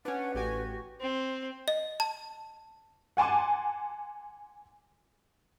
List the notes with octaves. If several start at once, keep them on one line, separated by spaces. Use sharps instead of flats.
C#4 D4 B4 F#5
A1 F#4 G4 G#5
C4
D#5
A5
F#5 G#5 A5 C6 D6